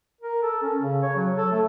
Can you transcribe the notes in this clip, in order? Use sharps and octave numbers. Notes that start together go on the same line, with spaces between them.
A#4
A4
C#4
C#3
C#5
F#3
A4
A3